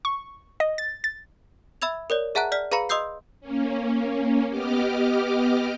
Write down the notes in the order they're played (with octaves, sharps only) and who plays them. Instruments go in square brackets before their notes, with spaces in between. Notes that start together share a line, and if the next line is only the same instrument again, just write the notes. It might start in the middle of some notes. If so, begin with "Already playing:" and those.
[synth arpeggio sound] C#6
D#5
A6
A6
[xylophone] E5 B5 E6 G#6 F7
A#4 C#5 D5
G#4 E5 F#5 A5 A#5 F#6
D5 F6 B6
G#4 B4 F5 A#5 B5 C#7
D#5 C6 D#6 E6 G6 C7
[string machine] A#3 C#4
B3 G4 D#5 D6 F6